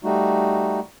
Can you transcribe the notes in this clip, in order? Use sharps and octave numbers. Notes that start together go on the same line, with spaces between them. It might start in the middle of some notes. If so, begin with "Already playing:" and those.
G3 A3 D#4 F#4